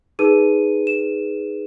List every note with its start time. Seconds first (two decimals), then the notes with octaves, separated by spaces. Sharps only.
0.19 D#4 G#4 B4 D#7
0.87 E7